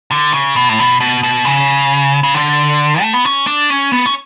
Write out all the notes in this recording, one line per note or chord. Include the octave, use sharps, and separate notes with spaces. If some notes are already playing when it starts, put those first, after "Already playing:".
D3
C#3
B2
A2
B2
B2
B2
C#3
C#3
D3
A3
B3
C#4
D4
C#4
B3
C#4